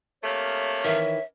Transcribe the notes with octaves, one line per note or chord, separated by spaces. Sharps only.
C3 A3 A#3 C#5
D#3 E3 E5